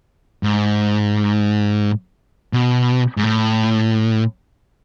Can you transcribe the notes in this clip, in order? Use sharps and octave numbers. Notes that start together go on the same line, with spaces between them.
G#2
B2
G#2
A2